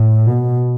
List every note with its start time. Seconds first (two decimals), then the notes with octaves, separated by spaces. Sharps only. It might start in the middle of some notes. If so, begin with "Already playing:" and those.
Already playing: A2
0.26 B2